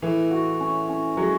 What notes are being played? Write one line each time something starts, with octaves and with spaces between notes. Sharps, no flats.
A2 E3
F#4
C#4
C#4
F#3 G#3